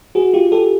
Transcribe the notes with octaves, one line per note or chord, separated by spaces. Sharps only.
F#4 G#4
F4 G4
G4 A4